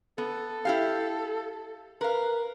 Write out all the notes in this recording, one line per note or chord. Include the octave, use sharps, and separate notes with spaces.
B3 A4
E4 G4 F5
A#4 B4 F5